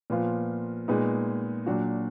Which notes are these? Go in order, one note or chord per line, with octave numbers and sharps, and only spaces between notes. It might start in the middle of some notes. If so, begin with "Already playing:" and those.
A#2 F3 B3 F4
A#2 G#3 B3 D#4
A#2 F#3 D4 F#4